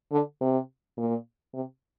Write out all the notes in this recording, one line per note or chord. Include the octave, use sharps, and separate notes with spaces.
D3
C3
A#2
C3